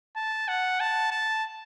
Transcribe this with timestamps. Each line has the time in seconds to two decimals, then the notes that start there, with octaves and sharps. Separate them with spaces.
0.16 A5
0.48 F#5
0.80 A5
1.11 A5